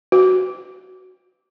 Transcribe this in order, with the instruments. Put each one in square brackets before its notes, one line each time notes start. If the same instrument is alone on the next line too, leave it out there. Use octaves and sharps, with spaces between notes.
[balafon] F#4